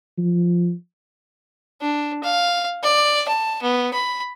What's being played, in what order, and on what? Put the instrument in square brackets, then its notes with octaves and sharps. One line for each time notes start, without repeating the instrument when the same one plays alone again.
[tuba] F3
[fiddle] D4
F5
D5
A5
B3
B5